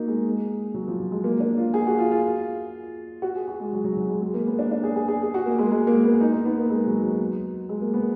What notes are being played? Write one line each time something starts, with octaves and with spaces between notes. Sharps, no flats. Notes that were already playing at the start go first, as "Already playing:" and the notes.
Already playing: A#3 D#4 F#4
G#3
F#3
F3
F#3
G#3
A#3
D4
F4
G#4
F#4
F4
F4
F#4
G#4
F#4
G#3
F#3
F#3
F#3
G#3
G#3
A#3
B3
D4
D4
G#4
G#4
G#4
G#4
F#4
A#3
G#3
G#3
A#3
B3
D#4
D#4
B3
A#3
G#3
F#3
F#3
G#3
A#3
B3